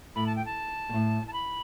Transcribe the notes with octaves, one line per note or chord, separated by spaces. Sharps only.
A2 B5
A5
G5
A5
B2
A2
A5
B5